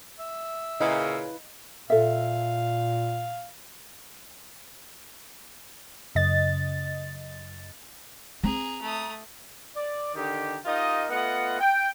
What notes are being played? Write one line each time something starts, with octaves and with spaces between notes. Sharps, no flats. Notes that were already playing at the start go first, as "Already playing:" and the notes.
E5
A#2 C#3 E4 B4 D#5 F5
A#2 A4 E5 F5
F#2 C#3 D#5 A6
C4 G#4 A#5
A3 D#6
D5
D3 D#3 D#4 G4
D#4 F4 G4 A#4 D#5
A3 B3 F4 D#5 F#5
G5